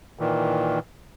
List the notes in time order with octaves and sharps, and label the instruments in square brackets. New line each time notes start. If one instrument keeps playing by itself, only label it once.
[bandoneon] A#2 D#3 E3